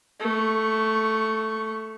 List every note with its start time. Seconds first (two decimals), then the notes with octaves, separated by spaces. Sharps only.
0.20 A3 C#6